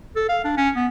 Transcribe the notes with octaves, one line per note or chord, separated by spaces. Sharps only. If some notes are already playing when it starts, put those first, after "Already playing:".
A4
F5
D4
C#4
B3